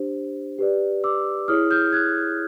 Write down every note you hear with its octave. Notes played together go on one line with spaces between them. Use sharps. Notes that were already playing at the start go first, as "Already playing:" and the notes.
Already playing: D4 G4 C5
G4 B4 D5
D6 E6
E4 G#4 C#5 D#6 F6
F6 G6
F#6 G#6